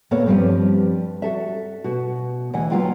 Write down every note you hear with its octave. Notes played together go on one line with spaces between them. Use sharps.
D2 A#2 B3 A4 C#5 F5
G2 F3 G3 C4 F4 B4
F#4 A4 E5
B2 F#4
D2 E3 D#5 F#5 G#5
D#2 F#3 B3 F4 G5